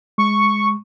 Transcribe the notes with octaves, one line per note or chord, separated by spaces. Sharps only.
G#3 C#6